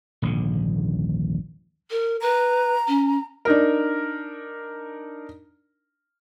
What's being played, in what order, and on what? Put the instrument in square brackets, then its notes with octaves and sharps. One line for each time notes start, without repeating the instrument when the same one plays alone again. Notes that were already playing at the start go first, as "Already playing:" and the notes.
[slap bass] D#1 A#1 G#2 D3
[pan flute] A#4
[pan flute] B4 [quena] A#5
[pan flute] C#4
[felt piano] D4 D#4 A#4